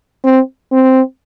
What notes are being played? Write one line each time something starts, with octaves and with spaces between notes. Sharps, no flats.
C4
C4